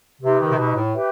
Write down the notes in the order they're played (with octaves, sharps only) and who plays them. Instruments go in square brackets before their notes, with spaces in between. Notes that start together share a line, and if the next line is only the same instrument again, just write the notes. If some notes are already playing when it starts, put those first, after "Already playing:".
[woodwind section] C3 [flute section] D#4 G4 B4
[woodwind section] D#3
C3
B2
A2
[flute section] G4 B4 E5 G5